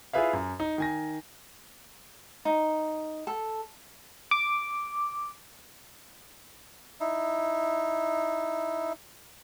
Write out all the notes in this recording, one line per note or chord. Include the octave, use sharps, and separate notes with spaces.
E4 F4 G#4 B4 E5 F5
F#2
D#4
D#3 G#5 A#6
D#4
A4
D6
D#4 E4